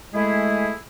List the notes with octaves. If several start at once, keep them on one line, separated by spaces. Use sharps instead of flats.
G#3 A3 E4 G#4